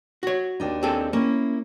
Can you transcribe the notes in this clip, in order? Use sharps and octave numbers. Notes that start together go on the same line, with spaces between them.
F#4 C#5
D#2 D4 D#4
C4 G#4 A4
A#3 C#4 E4